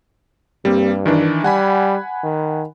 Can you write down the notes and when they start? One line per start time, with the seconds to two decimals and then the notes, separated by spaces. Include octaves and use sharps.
0.65 G2 G3 A#3 C4
1.06 D#3 E3 D4
1.44 G3 F#5 G#5 B5
2.24 D#3